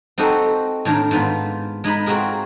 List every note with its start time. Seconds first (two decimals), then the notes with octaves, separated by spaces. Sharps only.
0.18 C4 D#4 F#4 G4 A4 D#5
0.85 A2 D#3 D4 A5 A#5
1.11 G#2 B3 F4
1.84 G#3 D#4 D#5 B5
2.06 C4 F4 F#4 G#4 A#4